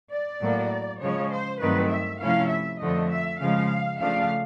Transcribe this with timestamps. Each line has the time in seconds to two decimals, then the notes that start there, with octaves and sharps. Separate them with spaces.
0.11 D5
0.41 A2 F#3 A#3
1.01 C#3 F3 G#3 C#5
1.31 C5
1.61 G2 D#3 F#3 A3 C4 B4
1.90 E5
2.21 C3 F3 A3 C#4 E4 F5
2.50 E5
2.80 F2 D3 F3 A3 D#5
3.11 E5
3.40 C#3 F3 G#3 F5
4.00 C#3 F3 A3 D4 F5